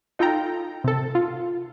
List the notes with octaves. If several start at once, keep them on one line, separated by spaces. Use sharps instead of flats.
D#4 F4 A4 G5 A#5
C3 A4
F4